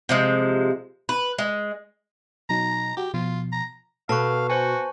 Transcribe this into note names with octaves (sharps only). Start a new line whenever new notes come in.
C3 F3 G#3
B4
G#3
B2 F#3 D#4 A#5
F#4 G4
B2 F3 F4
A#5
B2 A4 F5 A5 C#6 F#6
F#4 C5 G#5